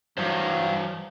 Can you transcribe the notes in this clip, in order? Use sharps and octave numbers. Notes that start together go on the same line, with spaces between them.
G2 E3 F#3 C5